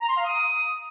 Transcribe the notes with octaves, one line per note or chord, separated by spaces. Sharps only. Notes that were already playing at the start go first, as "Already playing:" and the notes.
A#5
C6
F5
D#6